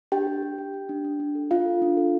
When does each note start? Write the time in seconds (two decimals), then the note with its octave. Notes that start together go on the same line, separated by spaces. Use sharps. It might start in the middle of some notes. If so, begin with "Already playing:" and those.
0.12 D4 G4 G5
0.27 G4
0.42 G4
0.58 G4
0.74 G4
0.89 D4
1.05 D4
1.20 D4
1.35 A4
1.51 F4 F5
1.66 A4
1.82 D4
1.97 A4